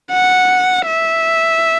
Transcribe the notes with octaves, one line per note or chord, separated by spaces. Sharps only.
F#5
E5